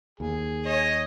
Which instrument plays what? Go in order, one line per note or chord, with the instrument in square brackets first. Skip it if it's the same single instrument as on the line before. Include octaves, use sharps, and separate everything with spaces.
[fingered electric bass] D#2 [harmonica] G#4
[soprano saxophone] C#5 [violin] D#5